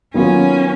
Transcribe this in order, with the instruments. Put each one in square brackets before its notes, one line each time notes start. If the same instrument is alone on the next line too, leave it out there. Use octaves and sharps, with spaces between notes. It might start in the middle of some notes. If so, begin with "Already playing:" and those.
[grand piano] D#3 F#3 B3 F4 [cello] C#4